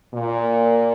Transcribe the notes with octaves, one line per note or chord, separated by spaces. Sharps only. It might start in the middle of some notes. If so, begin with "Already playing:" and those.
A#2